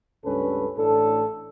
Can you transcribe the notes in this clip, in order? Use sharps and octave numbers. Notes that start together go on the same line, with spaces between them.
C#2 G2 A3 C#4 A4 B4
A1 A2 D4 A4